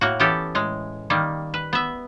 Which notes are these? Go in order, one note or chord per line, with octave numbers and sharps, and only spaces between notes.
A2 A#3 F#4
E3 B3 C#4 G4 A4
A2 G#3
D#3 G3 A#3
B4
B3 E5